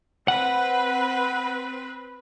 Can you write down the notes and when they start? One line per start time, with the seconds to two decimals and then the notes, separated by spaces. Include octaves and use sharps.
0.28 C4 B4 F#5